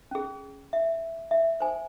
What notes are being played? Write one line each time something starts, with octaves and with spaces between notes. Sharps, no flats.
C#4 G#4
E5
E5
C5 G#5